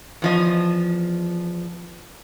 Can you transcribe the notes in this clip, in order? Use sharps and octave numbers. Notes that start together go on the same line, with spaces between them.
E2 F3 D#5